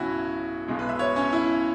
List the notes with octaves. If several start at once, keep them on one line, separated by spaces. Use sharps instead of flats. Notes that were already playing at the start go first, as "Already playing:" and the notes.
Already playing: B1 B2 F#3 C#4 E4 F#4
B1 B2 G#3
B4
E5
C#5
C#4
E4